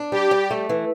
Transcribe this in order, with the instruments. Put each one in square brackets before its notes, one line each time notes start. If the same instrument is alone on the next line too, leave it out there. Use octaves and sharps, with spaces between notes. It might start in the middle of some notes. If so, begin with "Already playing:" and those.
Already playing: [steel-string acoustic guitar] D4
[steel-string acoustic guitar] G3 [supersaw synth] G4
[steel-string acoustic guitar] G3
A3
E3